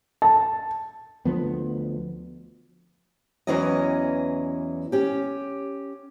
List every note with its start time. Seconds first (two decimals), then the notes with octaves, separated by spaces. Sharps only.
0.22 A5
1.25 D2 F3 B3
3.47 E2 E3 F#3 C#4 E4 D#5
4.92 C#4 G4